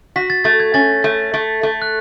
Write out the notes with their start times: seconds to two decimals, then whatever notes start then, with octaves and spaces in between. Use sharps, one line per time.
0.16 F#4 B6
0.30 A6
0.44 A3 A6
0.60 G#6
0.74 C#4 A6
1.04 A3
1.34 A3
1.63 A3
1.82 F#6